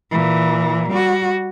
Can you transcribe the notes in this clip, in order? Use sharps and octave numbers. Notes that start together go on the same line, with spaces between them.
A#2 E3
G3 F#4